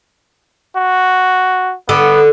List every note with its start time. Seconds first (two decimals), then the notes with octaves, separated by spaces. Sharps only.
0.76 F#4
1.89 D3 B3